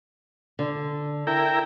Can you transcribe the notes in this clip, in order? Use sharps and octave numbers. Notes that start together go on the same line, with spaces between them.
D3
E4 A#4 G5